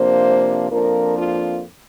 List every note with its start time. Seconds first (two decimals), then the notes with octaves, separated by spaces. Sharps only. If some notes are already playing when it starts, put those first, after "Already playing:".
Already playing: C3 F3 A#3 D4 C5
0.71 F2 F3 A#3 D4 A#4
1.18 F4